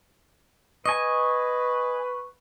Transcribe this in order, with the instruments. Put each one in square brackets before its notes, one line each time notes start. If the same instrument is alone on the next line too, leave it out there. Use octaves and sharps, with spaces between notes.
[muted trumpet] B4 [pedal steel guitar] D#5 G#5 [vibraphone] C#6